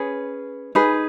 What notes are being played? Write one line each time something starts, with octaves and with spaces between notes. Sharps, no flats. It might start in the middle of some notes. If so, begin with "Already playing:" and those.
Already playing: C#4 G#4 B4
D#4 G#4 B4